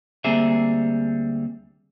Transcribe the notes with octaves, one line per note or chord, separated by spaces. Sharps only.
D2 G3 A#3 C4 G#4 E5